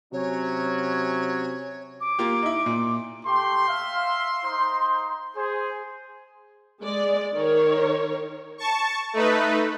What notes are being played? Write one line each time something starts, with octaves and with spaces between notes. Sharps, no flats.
C3 F#3 C#4 C#5
D6
A#3 F4 G4
D#4 E4
A#2
A3 G4 C6
E5 F5
D#4 C5
G#4 C5 G#5 C6
G#3 D5
D#3 A#4 C#5
A5 C#6
A3 D#4 B4